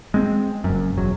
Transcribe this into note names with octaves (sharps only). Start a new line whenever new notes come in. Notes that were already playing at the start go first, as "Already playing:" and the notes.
G#3 C4
F#1 F#2
E1 F#3